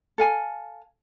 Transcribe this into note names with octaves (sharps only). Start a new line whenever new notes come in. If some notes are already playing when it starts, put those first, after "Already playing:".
A4 F5 G#5